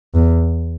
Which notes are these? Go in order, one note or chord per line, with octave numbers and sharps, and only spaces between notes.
E2